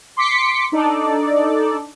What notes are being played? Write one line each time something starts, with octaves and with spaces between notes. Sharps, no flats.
C6 D6 B6 C#7
D4 D#4 A4 D5